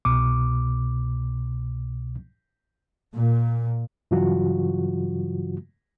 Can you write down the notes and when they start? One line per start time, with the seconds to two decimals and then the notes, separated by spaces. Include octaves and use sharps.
0.05 C2 B2 D6
3.16 A#2
4.11 G2 C#3 E3 F#3 F4 F#4